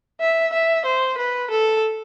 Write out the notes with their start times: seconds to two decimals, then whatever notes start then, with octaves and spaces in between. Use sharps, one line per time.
0.21 E5
0.53 E5
0.86 C5
1.18 B4
1.51 A4